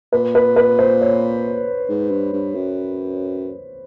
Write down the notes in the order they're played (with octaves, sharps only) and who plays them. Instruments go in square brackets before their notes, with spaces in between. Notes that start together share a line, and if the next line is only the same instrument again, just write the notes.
[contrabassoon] A#2 [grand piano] B4
[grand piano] B4
B4
C5
C#5
[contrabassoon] G#2
G2
G2
F#2